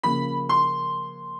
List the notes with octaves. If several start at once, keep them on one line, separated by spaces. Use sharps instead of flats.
C#3 F3 A#3 B5
C6